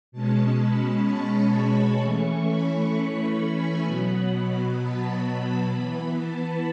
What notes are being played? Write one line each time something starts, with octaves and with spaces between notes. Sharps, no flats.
B2 G#3 C#4 A5
B5
C#6
B5
E3 A3 C#4 C#6
B5
C#6
B5
G#5
B2 F#3 B3 B5
B5
A5
E3 B3 B5
A5